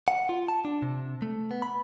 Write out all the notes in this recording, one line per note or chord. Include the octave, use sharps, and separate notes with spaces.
F#5
F4
A5
D4
C3
A3
B3
B5